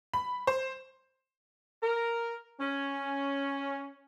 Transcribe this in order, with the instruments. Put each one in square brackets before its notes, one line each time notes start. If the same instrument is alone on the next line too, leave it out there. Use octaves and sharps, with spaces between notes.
[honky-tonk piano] B5
C5
[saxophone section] A#4
C#4